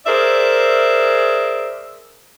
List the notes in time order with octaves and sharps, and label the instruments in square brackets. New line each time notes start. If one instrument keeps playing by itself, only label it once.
[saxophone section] G#4 A#4 C5 D5 E5